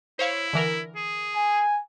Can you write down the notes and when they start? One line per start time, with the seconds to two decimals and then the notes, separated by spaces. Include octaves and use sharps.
0.19 E4 C5 C#5 F5
0.53 D3 E3 A#4
0.96 G#4
1.36 G#5